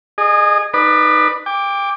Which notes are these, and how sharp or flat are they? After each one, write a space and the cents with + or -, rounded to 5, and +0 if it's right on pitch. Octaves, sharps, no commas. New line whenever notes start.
G#4 +0 D#5 -30
D#4 +0 B4 +0 D5 +30
G5 +30 D6 +0